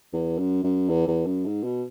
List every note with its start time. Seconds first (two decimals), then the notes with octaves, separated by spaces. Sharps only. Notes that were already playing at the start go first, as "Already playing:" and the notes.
0.13 E2
0.39 F#2
0.64 F#2
0.89 E2
1.08 E2
1.26 F#2
1.46 G#2
1.64 B2